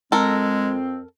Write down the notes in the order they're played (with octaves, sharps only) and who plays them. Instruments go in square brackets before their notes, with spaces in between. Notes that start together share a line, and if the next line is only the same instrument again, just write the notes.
[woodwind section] F2 C4 [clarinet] G#3 [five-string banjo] A4 A#4